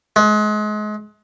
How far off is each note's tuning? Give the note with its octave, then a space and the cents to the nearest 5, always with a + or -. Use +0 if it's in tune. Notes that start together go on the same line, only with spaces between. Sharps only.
G#3 +30